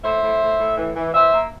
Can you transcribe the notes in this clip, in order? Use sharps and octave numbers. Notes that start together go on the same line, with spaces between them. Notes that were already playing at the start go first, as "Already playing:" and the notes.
A2 C5 E5
A2
A2
A2
E3
E3
E3 C5 E5
A#3